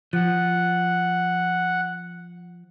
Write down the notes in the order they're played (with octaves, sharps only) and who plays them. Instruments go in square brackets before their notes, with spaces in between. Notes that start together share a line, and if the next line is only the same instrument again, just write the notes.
[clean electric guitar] F3 [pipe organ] F#5